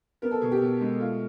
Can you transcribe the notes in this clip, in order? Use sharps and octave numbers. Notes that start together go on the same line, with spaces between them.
B3 A#4
A4
B2 G#4
G4
B2
G#3
A3 F4